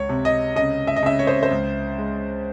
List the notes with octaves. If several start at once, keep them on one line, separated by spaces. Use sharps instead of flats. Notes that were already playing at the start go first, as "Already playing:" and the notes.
Already playing: C#2 C#5
C3
D#5
C#3 D#5
E5
D#5
C#3 E5
C#5
C5
C5
C#2
G#3